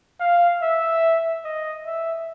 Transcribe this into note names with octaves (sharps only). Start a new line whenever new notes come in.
F5
E5
D#5
E5